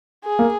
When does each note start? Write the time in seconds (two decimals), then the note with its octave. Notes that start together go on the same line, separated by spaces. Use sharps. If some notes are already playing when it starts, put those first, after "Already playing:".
0.24 G#4
0.39 A#3